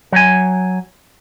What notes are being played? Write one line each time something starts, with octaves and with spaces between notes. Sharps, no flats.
F#3 G#5